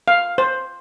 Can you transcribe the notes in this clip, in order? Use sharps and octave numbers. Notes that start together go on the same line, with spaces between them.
F5
C5